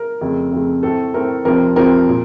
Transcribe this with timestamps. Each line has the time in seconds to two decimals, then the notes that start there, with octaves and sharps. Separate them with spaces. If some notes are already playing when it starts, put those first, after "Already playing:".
Already playing: A#4
0.21 F2 C#3 A3
0.52 F2 C#3 A3
0.83 A2 A3 C4 A4
1.14 A2 A3 C4 A#4
1.45 F2 C3 F3 C4 A#4
1.76 F2 C3 F3 C4 A#4
2.09 A#2